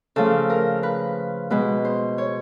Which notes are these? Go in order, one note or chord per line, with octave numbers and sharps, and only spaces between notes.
C#3 F3 A3 A4
A#4
B4
B2 G#3 B4
C5
C#5